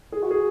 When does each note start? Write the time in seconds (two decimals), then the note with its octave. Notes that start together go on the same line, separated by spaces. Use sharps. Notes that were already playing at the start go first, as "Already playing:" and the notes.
0.12 G#4
0.22 F#4
0.31 G#4